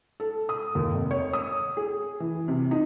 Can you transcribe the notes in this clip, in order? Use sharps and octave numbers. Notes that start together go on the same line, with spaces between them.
A4
D#6
D#2
F1
C#5
D#6
G#4
E3
C3
D#4